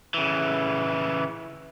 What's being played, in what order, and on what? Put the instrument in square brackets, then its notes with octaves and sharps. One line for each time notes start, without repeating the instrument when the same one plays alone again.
[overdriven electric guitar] C#3 E3